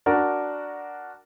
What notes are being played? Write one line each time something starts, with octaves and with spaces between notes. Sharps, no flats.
D4 F#4 A#4 D5